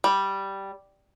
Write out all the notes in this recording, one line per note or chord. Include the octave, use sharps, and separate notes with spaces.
G3